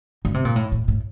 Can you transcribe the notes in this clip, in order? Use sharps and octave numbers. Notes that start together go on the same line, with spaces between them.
D3
C3
A#2
A2
A2
A2